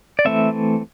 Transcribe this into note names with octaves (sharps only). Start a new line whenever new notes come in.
D5
E3 A3 C4 E5